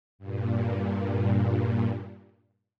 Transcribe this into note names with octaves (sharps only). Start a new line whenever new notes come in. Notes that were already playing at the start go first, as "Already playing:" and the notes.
G2 A#2